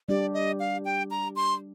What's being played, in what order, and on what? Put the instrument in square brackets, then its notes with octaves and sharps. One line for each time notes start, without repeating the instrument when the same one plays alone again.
[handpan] G3 D4 G4 [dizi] D5
[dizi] D#5
F5
G5
A#5
C6